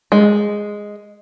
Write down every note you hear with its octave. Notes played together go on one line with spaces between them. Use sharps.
G#3